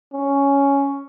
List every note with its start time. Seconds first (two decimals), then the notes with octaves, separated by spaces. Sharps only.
0.13 C#4